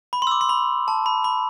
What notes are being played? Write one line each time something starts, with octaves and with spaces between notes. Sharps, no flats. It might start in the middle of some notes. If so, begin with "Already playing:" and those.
B5
C6
E6
D6
C6
B5
A5
B5
B5